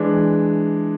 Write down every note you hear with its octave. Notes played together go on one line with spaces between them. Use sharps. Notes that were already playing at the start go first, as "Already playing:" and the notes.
Already playing: E3 G#3 D4